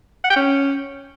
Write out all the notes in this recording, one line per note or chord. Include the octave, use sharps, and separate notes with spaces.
F#5
G5
C#4